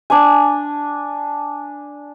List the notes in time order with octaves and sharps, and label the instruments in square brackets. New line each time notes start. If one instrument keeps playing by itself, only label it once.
[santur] D4 D5 G#5